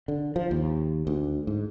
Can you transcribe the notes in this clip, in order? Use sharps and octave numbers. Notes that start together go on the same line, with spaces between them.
D3
F3
D#2
D2
G#2